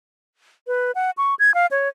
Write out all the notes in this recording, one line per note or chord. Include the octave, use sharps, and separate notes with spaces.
B4
F#5
C#6
G#6
F5
C#5